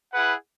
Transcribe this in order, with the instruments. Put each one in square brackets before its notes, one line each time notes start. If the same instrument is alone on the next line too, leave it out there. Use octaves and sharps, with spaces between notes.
[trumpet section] E4 G#4 B4 F#5